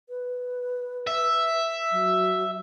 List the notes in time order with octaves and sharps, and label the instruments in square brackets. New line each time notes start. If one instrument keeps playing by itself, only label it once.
[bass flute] B4
[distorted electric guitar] E5
[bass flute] F#3